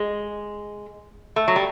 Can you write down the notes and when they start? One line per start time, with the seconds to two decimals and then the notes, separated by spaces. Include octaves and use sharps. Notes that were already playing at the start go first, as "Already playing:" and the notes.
Already playing: G#3
1.36 A3
1.48 F#3
1.56 G3